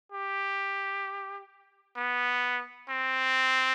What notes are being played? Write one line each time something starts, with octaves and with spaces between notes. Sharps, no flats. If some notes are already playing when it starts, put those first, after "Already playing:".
G4
B3
C4